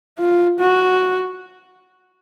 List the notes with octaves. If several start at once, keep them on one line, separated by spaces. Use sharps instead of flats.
F4
F#4